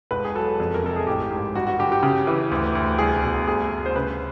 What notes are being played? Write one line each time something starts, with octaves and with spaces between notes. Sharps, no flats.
E1 B4
G#4
F#3 A4
F2
A#4
C3 A4
G#4
A1 G4
G#2
G2 F#4
F#4
D3 G4
G4
C#3
E3
D2
D2
C2 G#4
B2
D2 G#4
D2
C5
C#3 B4